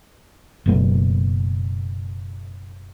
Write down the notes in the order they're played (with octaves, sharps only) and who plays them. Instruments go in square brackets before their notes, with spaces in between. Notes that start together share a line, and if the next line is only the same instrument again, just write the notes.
[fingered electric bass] F#1 B2 A3